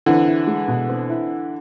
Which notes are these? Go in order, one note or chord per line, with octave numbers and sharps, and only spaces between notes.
D3 E3 C4
E4
G#3
B2
C4
E4